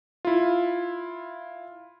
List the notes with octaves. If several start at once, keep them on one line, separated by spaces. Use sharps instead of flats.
E4 F4